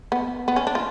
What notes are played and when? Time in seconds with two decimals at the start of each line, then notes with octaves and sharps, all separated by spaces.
0.12 B3
0.48 B3
0.56 C#4
0.67 D4
0.75 F4